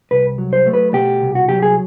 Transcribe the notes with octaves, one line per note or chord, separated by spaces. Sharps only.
C2 B4
F#3
C5
A3
B4
B2 G4
C2
F#4
F#3 G4
G#4